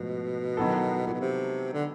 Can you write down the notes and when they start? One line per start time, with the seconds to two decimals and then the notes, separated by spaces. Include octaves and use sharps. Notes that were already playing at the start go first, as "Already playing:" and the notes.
Already playing: G#2 B2 F3 A3
0.57 D#3 F#3 B3 E4 A4
1.07 A#2
1.14 B2
1.20 C3
1.73 D3